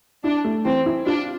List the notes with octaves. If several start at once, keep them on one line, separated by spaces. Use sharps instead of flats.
D4 E4
A3
E3 C4
E4
D4 F4